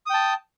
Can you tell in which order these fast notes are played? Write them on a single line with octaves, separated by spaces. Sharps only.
D#6 G5 A5